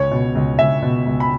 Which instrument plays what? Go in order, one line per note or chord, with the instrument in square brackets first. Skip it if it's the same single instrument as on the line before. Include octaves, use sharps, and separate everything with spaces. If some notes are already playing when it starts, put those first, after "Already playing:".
Already playing: [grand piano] C#2 C#5
B2
C#2
C#2 E5
B2
C#2
B5